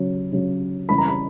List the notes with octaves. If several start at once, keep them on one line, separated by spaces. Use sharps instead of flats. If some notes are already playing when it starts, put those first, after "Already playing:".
Already playing: C#3 F#3
C#3 F#3
C#3 E3 G3 B5
A#5
B5